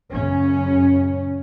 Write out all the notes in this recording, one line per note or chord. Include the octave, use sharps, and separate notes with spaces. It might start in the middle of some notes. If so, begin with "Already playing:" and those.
F#2 C#3 C#4